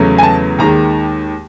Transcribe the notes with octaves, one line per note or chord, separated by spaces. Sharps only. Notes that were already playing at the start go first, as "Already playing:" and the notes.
Already playing: E2 C#3 F#3 A3
G#5
A5
D#2 D#3 G#3 A#5